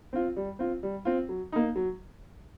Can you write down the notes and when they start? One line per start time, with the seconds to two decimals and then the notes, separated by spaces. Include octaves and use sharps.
0.13 C4 F4
0.36 G3
0.59 C4 F4
0.83 G3
1.05 C4 F4
1.29 F#3
1.52 A#3 D#4
1.76 F#3